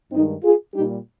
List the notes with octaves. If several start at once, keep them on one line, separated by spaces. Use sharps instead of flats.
G2 D#3 G#3 C4 D#4
F4 G#4
A#2 G3 D#4 G4